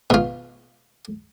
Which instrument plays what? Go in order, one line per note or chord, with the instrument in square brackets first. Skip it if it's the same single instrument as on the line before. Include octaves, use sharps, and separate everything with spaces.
[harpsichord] B2 F4